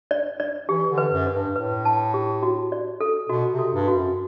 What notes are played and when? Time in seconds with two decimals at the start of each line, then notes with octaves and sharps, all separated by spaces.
0.11 D5
0.40 D5
0.69 E3 G4
0.91 D3
0.98 B4
1.12 F#2
1.27 B4
1.34 G2
1.55 A2 B4
1.85 A5
2.14 G4
2.43 F#4
2.72 D5
3.01 A4
3.29 B2 F#4
3.52 C3
3.59 A4
3.73 G2
3.88 F#4
3.95 F#2